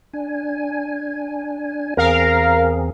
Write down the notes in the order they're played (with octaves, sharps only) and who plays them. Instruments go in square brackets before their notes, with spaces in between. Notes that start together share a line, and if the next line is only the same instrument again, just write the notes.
[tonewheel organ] D4 G#5
[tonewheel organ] E2 C4 G#4 [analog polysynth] A#4 F5